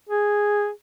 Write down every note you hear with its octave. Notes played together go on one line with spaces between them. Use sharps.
G#4